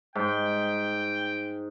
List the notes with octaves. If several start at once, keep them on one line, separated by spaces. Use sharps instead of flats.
G#2 G5